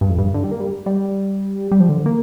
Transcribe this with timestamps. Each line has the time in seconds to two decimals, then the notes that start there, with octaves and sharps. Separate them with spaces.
0.01 G2
0.09 F2
0.18 G2
0.34 D3
0.44 G3
0.51 A#3
0.60 G3
0.86 G3
1.71 G3
1.80 F3
1.89 D3
2.06 A#3